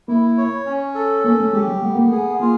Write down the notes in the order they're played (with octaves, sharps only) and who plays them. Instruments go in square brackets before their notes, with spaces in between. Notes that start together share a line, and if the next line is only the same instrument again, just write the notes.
[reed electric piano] A#3 [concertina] E4
[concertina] C#5
C#4
A4
[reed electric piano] A#3 [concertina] C#4
[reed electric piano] A3
[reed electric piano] G#3 [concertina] G4
[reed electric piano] G3
[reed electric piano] A3 [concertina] B3
[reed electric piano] A#3
[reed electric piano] A3 [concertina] G#4
[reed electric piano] A#3 [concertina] F4